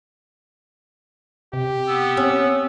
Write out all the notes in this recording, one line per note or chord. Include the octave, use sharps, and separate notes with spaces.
C3 G4
B3 E6
C4 C#4